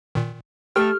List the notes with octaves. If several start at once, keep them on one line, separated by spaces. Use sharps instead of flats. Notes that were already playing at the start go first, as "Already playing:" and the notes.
A#2 D#3
A3 G4 A4 G5 F6